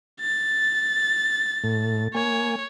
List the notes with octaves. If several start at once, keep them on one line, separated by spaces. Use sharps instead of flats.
A6
A2
A#3 C#5 G#5